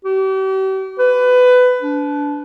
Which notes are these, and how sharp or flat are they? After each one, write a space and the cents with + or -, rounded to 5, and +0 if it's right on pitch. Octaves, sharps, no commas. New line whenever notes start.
G4 -40
B4 +20
D4 -25